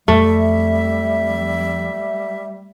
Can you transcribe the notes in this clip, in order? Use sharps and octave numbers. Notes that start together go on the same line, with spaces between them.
F2 G3 A3 E5